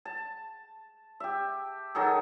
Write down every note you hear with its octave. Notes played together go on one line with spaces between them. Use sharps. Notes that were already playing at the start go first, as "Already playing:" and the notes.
A5
G4 E5
D#3 F#3 G#4 A4